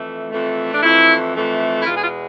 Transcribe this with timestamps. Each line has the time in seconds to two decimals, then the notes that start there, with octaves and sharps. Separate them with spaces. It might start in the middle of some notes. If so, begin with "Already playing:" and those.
Already playing: F2 E3 A3
0.30 F2 E3 A3
0.72 D4
0.82 F2 E3 A3 E4
1.35 F2 E3 A3
1.79 E4
1.86 E2 B2 G#3 F4
1.97 G#4
2.03 F4